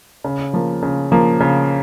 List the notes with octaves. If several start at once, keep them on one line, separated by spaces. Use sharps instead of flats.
C#3
F3 A#3
C#3
F3 A#3
C#3